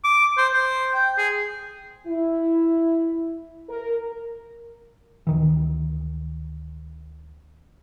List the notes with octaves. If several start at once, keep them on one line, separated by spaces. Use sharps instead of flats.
D6
C5
C5
G5
G#4
E4
A#4
D2 D#3 E3